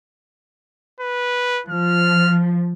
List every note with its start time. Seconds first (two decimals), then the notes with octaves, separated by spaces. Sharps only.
1.01 B4
1.69 F3 F6